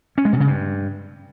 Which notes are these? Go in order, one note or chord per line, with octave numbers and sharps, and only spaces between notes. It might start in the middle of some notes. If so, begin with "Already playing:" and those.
C#4
G#3
B2
C#3
G2